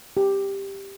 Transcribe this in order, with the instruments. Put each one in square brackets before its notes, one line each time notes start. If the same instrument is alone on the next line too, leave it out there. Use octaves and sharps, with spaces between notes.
[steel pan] G4